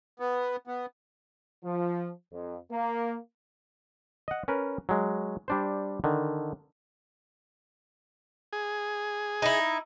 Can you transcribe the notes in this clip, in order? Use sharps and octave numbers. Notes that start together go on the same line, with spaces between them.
B3
B3
F3
F2
A#3
D#5 F#5
C#4 A#4 B4
F#3 G#3
G3 D4 C5
D3 D#3
G#4
D#4 E4